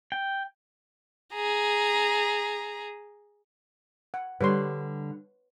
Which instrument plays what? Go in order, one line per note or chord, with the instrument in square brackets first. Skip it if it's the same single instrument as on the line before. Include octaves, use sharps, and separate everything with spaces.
[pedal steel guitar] G5
[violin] G#4 A#5
[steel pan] F#5
[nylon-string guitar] D3 G3 [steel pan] B4 C#5 C6